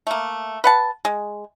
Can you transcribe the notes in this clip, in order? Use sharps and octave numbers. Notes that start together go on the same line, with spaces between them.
A3 A#3
B4 F#5 A5
G#3